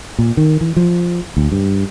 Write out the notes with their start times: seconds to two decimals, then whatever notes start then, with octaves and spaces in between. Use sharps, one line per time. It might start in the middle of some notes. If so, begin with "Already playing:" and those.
0.19 A#2
0.37 D#3
0.61 E3
0.76 F3
1.37 D2
1.52 G2